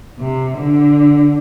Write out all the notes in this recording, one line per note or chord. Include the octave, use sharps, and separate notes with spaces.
C3
D3